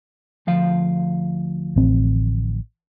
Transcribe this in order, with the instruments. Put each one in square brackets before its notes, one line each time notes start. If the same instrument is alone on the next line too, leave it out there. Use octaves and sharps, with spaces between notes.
[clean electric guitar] D2 F3 F5
[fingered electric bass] A1 C4